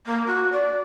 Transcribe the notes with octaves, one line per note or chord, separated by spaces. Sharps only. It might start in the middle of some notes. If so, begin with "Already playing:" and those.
A#3
F#4
D5